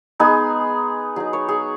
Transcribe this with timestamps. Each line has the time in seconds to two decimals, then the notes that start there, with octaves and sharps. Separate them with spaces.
0.20 G#3 B3 D#4 G#4
1.16 F#3 D#4 G#4
1.33 C#5
1.49 G#4